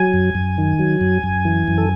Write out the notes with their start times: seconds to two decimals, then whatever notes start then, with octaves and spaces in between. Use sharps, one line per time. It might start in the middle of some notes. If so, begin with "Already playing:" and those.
Already playing: F#3 G#5
0.14 F#2
0.35 F#2
0.58 D#3
0.79 F#3
1.01 F#2
1.23 F#2
1.45 E3
1.68 F#2
1.78 A4